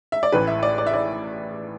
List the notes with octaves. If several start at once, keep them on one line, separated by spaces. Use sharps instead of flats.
E5
D5
A1 A2 E3 B4
E5
D5
D5
E5
D5